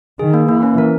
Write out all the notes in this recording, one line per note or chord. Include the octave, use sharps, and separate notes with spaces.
D#3 G#4
A#3
E3 A#3
C#4
A#4